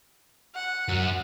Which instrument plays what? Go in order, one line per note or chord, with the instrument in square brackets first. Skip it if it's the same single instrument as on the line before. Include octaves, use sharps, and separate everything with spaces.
[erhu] F#5
[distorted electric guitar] F#2